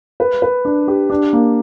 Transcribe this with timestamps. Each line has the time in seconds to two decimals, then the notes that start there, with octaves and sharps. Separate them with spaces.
0.20 B4
0.42 B4
0.65 D4
0.88 G4
1.10 D4
1.33 A#3